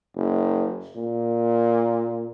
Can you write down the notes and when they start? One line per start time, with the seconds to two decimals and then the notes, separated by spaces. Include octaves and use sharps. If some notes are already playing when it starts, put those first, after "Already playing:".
0.16 F#1
0.96 A#2